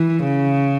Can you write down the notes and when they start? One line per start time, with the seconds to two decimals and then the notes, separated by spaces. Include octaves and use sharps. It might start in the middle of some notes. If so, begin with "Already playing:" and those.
Already playing: E3
0.23 C#3